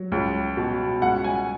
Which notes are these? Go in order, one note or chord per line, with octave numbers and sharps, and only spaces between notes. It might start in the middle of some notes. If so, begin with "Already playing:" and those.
Already playing: F#3
C#2
B2
C#2 F#5
G#5